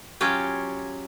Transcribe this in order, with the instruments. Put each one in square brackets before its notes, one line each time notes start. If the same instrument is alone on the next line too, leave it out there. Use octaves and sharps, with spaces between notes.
[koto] F#3 C#4 F4 G4